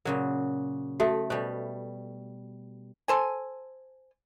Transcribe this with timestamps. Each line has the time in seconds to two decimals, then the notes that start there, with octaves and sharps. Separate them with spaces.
0.05 A#2 C#3 F#3 A#4
1.00 A3 F#4 A4 E5
1.30 B2 G3 C5
3.08 A4 C5 G#5